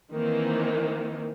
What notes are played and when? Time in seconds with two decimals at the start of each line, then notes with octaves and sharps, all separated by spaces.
0.15 D#3 E3 A#3 C4